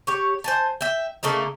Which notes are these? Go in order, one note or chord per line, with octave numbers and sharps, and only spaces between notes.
G4 C#5
C5 G#5 A5
E5 G5
C#3 A3 A#3 D#4